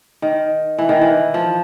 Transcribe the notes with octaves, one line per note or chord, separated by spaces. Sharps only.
D#3
E3
D#3
E3
F3